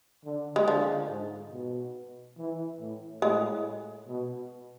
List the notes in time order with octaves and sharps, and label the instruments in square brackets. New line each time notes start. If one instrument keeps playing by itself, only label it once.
[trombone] D3
[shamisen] G#3
[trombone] D3 [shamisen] F3
[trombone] G#2
B2
E3
A2
[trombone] A2 [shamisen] G#3
[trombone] B2